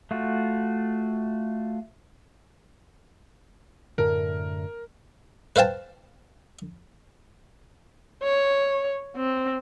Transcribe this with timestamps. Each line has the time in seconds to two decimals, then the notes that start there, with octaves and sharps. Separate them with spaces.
0.11 A3 F4 F#4
3.98 F#2 A2 D3 A#4
5.56 B4 C5 F5 G5 A5
8.24 C#5
9.17 C4